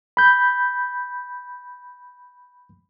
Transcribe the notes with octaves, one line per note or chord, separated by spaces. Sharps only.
B5 G6